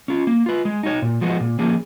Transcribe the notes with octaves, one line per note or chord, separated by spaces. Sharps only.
C#4 F4
A#3
F4 B4
G#3
D#4 F#4 C#5
A#2
F3 G#3 B3 F#4
A#2
F3 A#3 C#4 G#4